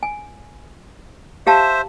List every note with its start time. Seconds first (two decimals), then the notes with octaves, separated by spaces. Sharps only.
0.03 G#5
1.47 G4 C5 E5 F5 A5